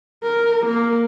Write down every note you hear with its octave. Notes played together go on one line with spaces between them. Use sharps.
A#4
A#3